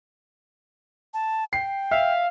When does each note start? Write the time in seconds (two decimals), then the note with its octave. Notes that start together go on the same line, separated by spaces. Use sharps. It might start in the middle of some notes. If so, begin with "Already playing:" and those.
1.14 A5
1.53 G5 C7
1.91 E5 F5